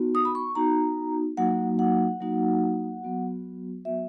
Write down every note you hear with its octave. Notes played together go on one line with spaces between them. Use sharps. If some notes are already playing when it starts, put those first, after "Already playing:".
Already playing: B3 D#4 F#4
D#6
B5
C#6
B3 D#4 F#4 A#5
F#3 A#3 D#4 F#4 F#5
F#5
F#3 A#3 D#4 F#4
F#3 B3 F#4
F#3 B3 F#4 E5